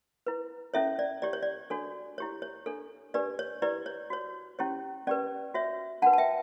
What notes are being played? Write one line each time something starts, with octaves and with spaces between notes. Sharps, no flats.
E4 B4
C#4 E4 A4 C#5 E5
D5
E4 G4 C#5 D5
C#5
D5
D4 F#4 A4 C#5
E4 G4 C#5
C#5
D4 A4 C#5
D4 G4 B4 D5
C#5
E4 G4 B4 D5
C#5
F#4 C#5
C#4 E4 G4 C#5
C#4 G4 B4 D5
F#4 C#5 E5
D4 F#4 B4 F#5 A5
A5
E5 G5